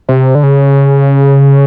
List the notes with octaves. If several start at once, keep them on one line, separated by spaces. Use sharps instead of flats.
C3
D3
C#3